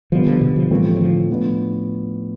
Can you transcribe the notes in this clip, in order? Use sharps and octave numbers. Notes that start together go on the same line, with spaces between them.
B2 D3 F3 G3 B3
D3 F3
B2 D3
D3 F3
A2 E3 F3 G3 A3 C4
G3
D3 F3
A2 F3 B3 D4